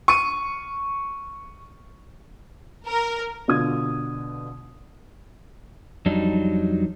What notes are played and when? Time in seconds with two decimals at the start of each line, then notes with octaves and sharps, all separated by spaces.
0.08 C#6 D#7
2.87 A#4
3.48 B2 D3 F4 D#6 G#6
6.06 F2 F#3 G3 D4 D#4